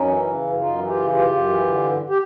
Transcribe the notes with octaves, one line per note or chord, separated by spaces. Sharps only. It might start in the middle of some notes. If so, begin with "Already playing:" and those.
Already playing: F#2 C#4 D#4
E3
C#3
F#2
F#2 D#4 F4
E3
F4 G4
C#3
F#2 F4 G4
F#2
E3
D3
G2
G4